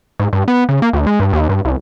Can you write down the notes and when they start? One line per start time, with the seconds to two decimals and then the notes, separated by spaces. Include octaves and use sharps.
0.20 G#2
0.33 G2
0.48 B3
0.69 C#3
0.82 A#3
0.93 D2
1.07 G#3
1.20 G2
1.33 D#2
1.49 G2
1.65 C2